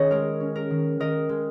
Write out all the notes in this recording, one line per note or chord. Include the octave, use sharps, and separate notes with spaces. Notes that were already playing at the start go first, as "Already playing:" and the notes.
Already playing: D#3 C#4 G#4 C#5 D#5
G#3 A#4
C#4
A#4
D#3
D#3 A#4 D#5
G#3